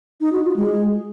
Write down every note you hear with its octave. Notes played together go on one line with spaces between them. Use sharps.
D#4
F#4
F4
G#3